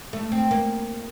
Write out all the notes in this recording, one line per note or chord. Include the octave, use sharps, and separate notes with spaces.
A3
C4
A#3